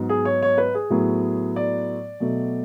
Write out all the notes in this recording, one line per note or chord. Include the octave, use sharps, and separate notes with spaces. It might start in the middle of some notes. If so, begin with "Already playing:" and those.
Already playing: G#2 F#3 B3
G#4
C#5
C#5
B4
G#4
A2 F#3 B3
D5
B2 F#3 A3